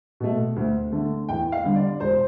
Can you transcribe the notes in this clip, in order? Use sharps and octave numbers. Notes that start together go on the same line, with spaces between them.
B2 A3
D2
D3 A3
E2 G5
F5
D3 G3
D5
E1 C5